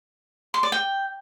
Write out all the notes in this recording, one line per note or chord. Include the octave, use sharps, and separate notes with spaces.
C6
D5
G5